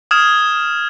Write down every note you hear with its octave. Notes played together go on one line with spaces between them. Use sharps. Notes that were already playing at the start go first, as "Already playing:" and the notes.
D#6 F6 G#6 E7